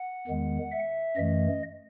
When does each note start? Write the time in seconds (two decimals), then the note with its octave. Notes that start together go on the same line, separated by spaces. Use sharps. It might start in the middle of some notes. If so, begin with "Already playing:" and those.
Already playing: F#5
0.27 E2 D#3 G#3 B3
0.72 E5
1.16 F#2 E3 A3 D#5